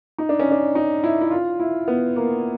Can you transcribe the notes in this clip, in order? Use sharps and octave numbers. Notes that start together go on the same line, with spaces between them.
D#4
D4
C#4
D4
D#4
E4
E4
F4
E4
B3
A#3